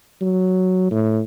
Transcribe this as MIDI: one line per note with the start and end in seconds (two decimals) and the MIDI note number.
0.21 0.89 54
0.91 1.21 45